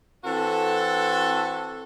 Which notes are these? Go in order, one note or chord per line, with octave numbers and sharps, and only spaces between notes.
E3 C4 F#4 A4